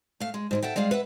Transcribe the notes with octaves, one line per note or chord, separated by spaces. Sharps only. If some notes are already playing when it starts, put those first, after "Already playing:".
A3 F5
G#3
G#2 G3 G#3
A4 E5 F#5 G5
G3 G#3 G#4 F5
B4 E5 F#5